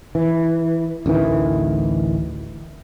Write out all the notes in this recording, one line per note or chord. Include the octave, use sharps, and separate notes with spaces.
E3
A1 D2 D#3 E3